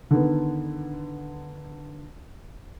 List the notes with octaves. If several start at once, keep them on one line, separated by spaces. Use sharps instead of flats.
D3 D#3 B3